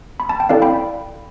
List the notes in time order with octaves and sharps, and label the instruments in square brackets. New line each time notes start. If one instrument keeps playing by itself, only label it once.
[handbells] B5
A5
G5
C4 E4 A4 D5 F5
G5 B5